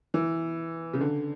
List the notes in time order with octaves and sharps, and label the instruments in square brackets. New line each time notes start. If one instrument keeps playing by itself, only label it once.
[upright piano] E3
C#3
D3